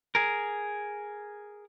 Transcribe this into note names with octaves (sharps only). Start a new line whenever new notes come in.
G#4 A#4